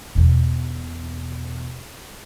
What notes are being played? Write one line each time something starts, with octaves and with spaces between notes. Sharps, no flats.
E2 B2